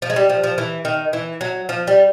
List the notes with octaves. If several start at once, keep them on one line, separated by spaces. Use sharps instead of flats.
F3
G#3
G3
F3
F3
E3
D#3
E3
F#3
F3
G3